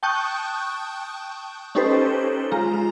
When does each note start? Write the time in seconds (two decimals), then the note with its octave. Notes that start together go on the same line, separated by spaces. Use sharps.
0.03 G5 A5 C#6 D#6 F#6 G6
1.75 C#4 D#4 G4 A4 B4 C5
2.51 G#3 F4 A#5